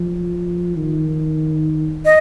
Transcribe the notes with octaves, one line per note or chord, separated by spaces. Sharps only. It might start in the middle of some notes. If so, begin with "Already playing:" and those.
Already playing: F3
D#3
D#5